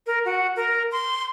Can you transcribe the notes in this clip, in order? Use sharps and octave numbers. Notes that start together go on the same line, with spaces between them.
A#4
F#4
A#4
C6